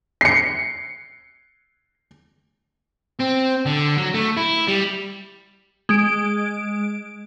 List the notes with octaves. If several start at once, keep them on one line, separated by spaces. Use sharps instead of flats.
C7 C#7
C4
D3
F#3
A3
E4
G3
G#3 D7